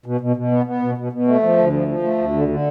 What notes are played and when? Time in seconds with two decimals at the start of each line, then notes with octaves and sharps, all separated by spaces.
0.06 B2
0.21 B2
0.36 B2
0.51 B3
0.66 B3
0.82 B2
0.97 B2
1.12 B2
1.27 A3
1.43 F3
1.58 D2
1.72 F3
1.88 F3
2.03 A3
2.18 D2
2.33 D3
2.48 D3